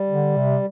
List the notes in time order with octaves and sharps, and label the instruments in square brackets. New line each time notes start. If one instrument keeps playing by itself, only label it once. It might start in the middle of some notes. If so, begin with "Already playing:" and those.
Already playing: [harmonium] G3
[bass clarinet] D3
C3